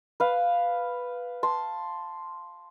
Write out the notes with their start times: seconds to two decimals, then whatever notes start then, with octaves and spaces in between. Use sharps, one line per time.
0.20 B4 F5
1.43 A5 C6